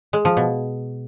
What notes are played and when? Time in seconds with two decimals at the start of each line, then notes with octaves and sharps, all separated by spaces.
0.13 G#3
0.25 F3
0.37 B2